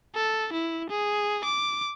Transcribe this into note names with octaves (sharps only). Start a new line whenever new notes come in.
A4
E4
G#4
D6